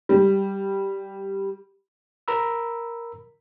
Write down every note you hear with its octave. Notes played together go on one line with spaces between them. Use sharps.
G3
A#4 A#5 B5 E6